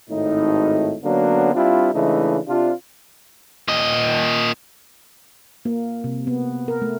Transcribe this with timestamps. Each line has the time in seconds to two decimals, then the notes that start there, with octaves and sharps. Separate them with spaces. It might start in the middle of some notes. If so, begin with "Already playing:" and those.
0.10 G#1 A2 D#4
1.04 D3 F#3 A#3 B3 C#4 D4
1.54 G3 C4 D4 E4 F4
1.93 C#3 E3 G#3 A3 D4 D#4
2.48 C3 D4 F4
3.68 A#2 D#5
5.65 A#3
6.04 C3
6.27 B3
6.68 A#4
6.82 A3